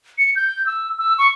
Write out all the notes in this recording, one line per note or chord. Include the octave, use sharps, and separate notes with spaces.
C#7
G6
E6
E6
C#6